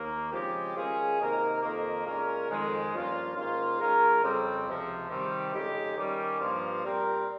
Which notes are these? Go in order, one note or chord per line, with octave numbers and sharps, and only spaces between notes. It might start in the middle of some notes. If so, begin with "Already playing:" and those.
Already playing: D#2 D#3 A#3
C#3 F3 G#3 C4 G4
D#3 G#3 C#4 F4 G#4
C3 D#3 A#3 D#4 A#4
F2 D#3 A#3
A#2 G#3 C#4 F4 A#4
F2 D#3 G#3
G2 F3 A#3 C#4 F4
G#2 D#3 A#3 C#4 F4
D#3 G#3 C#4 F4 A#4
F2 C#3 G3 C4
C#2 C3 F3
C3 D#3 G3 C4
F2 C#3 G#3 D#4 G4
D#3 G3 C#4 G4
G2 F3 A#3 F4
A#2 G3 C4 G4 A#4